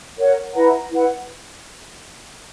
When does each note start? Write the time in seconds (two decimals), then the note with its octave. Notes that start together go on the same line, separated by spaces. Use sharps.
0.18 A#4 C#5 F#5
0.54 E4 B4 F#5 A#5
0.90 E4 B4 F#5